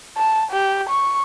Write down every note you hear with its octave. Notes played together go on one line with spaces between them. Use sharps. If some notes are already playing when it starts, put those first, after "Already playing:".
A5
G4
C#6